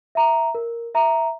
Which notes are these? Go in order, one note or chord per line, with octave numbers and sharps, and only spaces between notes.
E5 A#5
A#4
E5 A#5